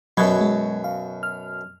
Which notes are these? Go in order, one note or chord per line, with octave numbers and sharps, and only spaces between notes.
F#2 B2 F#3 B5 G#6
G#3
F5
F6